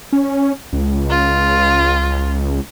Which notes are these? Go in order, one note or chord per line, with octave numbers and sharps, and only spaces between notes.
C#4
C#2
F4